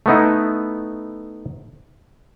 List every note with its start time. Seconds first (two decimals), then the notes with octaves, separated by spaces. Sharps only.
0.06 A3 B3 D#4 E4